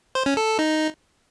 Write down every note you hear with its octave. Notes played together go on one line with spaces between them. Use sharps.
C5
C#4
A4
A4
D#4